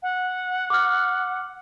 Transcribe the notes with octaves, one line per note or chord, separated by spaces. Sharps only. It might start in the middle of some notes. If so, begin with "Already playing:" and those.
F#5
D6 F6